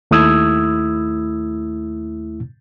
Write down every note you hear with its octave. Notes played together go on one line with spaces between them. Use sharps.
D#2 A3 E4 D#6 E6 G#6